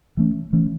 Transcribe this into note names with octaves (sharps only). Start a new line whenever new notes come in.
E3 A3 C#4
E3 A3 C#4